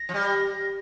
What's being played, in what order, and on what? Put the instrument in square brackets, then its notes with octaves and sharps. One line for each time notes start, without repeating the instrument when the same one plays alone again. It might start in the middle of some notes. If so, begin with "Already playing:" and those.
Already playing: [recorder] A#6
[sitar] F3
G3